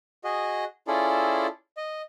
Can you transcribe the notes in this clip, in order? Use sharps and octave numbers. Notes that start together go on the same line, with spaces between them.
F#4 G#4 D#5
C#4 E4 F4 G#4 A4 D5
D#5